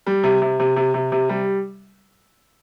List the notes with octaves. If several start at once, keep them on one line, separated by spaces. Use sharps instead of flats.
G3
C3
C3
C3
C3
C3
C3
G3